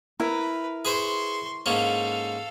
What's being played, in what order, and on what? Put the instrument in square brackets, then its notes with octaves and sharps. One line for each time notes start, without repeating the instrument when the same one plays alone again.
[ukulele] E4 [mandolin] A#4 [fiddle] B4
[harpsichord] G#4 B4 C5 [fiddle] C6 C#6
[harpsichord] G#2 A#3 C#4 [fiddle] A4 F5